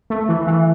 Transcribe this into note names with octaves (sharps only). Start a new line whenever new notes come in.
A3
E3
E3